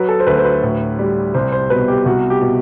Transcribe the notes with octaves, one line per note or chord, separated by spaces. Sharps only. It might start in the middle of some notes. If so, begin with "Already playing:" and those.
Already playing: F#3 B4
A4
C5
D2 B4
C5
B4
A2
G3
C2 C5
C5
B2 B4
G4
C2 F#4
G4
B2